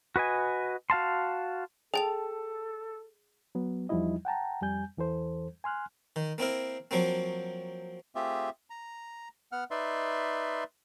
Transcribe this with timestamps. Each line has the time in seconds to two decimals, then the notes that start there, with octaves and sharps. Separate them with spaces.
0.16 F#4 B4 D#5 G#5
0.90 F#4 F5 A5 C6
1.94 G#4 A4 G5 A5 F7
3.55 F#3 B3
3.89 E2 F3 G3 D#4 E4 D#5
4.25 F#5 G5 A5 A#5
4.61 F2 G3 G#5 G6
4.97 E2 E3 A4 C5
5.64 G#5 C6 F6 F#6
6.16 D#3
6.38 A#3 C4 E4 A#4
6.91 F3 F#3 A#3 C4
8.15 A3 C4 F4 G4 G#4 E5
8.70 A#5
9.52 B3 F#5 F6
9.71 D#4 B4 D5 E5 C6